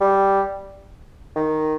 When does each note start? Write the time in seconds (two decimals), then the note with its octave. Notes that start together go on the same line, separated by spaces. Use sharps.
0.01 G3
1.36 D#3